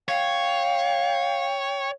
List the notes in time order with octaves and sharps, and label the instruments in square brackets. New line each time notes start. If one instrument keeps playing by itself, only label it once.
[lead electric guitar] C#5 [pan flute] F5 [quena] G5